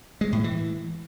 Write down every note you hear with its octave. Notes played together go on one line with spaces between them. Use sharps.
G#3
A2
E3